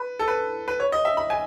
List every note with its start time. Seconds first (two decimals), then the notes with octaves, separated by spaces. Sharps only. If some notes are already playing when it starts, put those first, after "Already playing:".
Already playing: B4
0.19 A4
0.28 B4
0.68 B4
0.80 C#5
0.92 D#5
1.05 E5
1.17 B5
1.30 G#5